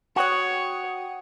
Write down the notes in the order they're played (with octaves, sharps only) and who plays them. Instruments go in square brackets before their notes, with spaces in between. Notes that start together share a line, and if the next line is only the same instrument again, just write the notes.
[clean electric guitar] F#4 [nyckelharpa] C#5 [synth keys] F#5 G5 D#6